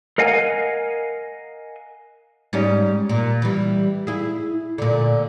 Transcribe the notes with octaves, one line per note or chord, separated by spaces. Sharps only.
A#4 D#5 F5 F#5 G#5
G#2 G3 C#4
A#2
E3 G3
E4 G#4
A#2 D3